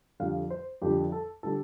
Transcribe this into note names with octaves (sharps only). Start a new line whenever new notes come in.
F2 D3 G3 F5
C5
F2 D3 G3 G4
A4
D3 G3 A4